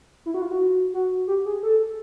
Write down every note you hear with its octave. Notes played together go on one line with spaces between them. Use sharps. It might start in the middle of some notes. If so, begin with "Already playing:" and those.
E4
F#4
F4
F#4
F#4
G4
G#4
A4